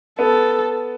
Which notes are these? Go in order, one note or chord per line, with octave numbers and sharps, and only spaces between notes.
B3 A4